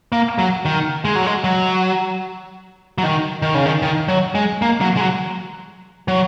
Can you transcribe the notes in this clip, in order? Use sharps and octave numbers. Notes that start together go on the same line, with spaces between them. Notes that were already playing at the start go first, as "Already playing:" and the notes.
A#3
F#3
D#3
G#3
F#3
G#3
F#3
F#3
D#3
D#3
C#3
D#3
D#3
F#3
G#3
A#3
F#3
G#3
F#3
F#3